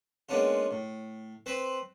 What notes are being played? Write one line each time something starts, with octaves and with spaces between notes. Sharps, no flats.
G#3 A#3 B3 C#4 D4 F4
A2
C4 B4 C5 B5